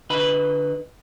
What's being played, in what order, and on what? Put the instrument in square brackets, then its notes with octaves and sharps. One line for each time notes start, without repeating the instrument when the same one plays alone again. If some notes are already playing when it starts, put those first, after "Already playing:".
[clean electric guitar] D3 B4 D#5 B5